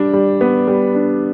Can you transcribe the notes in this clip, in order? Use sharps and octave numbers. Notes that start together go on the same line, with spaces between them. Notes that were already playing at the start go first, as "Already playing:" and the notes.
Already playing: G3 D4
G3
B3
G3
D4